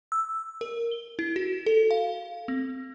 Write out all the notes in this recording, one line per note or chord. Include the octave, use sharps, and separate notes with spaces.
E6
A#4
G7
E4
F#4
A4
F5
C4